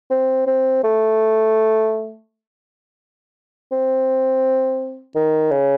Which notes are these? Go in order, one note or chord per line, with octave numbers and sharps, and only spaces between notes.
C4
C4
A3
C4
D#3
C#3